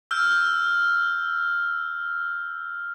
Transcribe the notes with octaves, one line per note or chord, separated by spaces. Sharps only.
E6 F6 G6